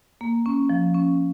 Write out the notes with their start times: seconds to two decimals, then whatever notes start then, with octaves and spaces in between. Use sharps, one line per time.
0.21 A#3
0.46 C#4
0.70 F3
0.94 C#4